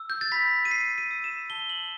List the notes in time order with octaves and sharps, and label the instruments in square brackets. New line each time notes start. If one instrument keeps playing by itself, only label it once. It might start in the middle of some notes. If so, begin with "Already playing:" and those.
Already playing: [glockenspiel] E6
G6
A6
B5 B6
D#7
B5 C7
D#7
E6
E7
A5 G7
F#7